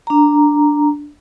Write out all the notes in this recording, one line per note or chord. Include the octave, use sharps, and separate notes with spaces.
D4 A#5